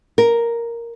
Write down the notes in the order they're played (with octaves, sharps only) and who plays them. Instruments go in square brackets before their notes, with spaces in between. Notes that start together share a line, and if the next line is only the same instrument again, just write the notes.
[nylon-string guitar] A#4